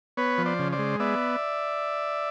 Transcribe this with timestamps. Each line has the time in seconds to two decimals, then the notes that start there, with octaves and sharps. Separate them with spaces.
0.17 B3 B4 C#5
0.38 F3
0.46 C5 D5
0.59 C#3
0.72 C5 D5
0.79 G#3
1.00 B3 D5 E5